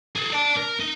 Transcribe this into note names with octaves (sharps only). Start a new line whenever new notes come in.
G#4 A4
D5 A5
A#4
D#4